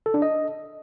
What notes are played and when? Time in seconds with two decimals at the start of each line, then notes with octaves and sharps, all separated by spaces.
0.06 A4
0.14 D4
0.22 D#5